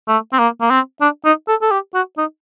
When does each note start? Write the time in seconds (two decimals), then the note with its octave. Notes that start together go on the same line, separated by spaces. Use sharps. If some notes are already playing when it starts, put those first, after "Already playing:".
0.08 A3
0.33 C4
0.39 A#3
0.61 A#3
0.70 C4
1.01 D4
1.25 D#4
1.48 A4
1.62 A4
1.71 G4
1.95 F#4
2.18 D#4